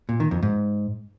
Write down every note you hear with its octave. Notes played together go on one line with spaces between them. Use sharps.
A#2
D#3
F2
G#2